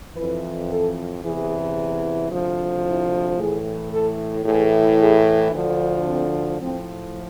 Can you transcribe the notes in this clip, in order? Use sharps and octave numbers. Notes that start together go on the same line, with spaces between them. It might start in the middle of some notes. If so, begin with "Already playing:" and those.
F2 E3 B4
A4
E2 C3 E3 G#4
D2 C3 F3
E4
A2 E3 G#4
A4
A2 E3 G#4
G#4
D2 D3 F3
C4
A2 F3 C4